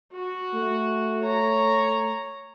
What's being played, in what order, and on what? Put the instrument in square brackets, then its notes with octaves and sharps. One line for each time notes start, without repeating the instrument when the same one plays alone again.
[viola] F#4
[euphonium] A3
[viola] C#5 A#5